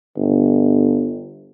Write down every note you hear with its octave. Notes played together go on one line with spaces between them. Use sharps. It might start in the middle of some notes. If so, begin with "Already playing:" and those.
G1